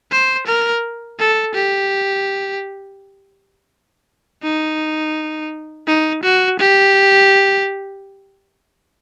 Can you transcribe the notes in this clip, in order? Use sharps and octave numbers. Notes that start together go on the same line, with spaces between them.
C5
A#4
A4
G4
D#4
D#4
F#4
G4